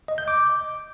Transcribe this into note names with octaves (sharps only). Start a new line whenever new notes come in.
D#5
G6
D6